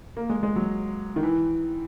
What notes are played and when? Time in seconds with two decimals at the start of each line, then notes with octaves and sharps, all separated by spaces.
0.17 A#3
0.29 G#3
0.43 G#3
0.56 F#3
1.16 D#3
1.23 E3